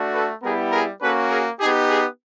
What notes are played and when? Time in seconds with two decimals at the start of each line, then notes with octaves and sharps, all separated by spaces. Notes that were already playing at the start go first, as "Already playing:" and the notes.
Already playing: A3 D4 F#4
0.13 A4 B4
0.43 G3 B3 E4 G4 G#4 A#4
0.72 G#4 A#4
1.01 A#3 C#4 F#4 A4 B4
1.30 G#4 A#4
1.60 B3 D#4 G4 G#4
1.90 G#4